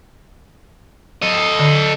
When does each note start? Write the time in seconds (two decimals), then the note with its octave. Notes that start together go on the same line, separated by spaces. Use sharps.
1.22 A4 D#5
1.59 D3